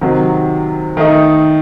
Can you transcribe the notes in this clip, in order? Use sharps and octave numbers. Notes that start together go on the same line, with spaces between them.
C3 D#3 F#3
D#3 A3 D#4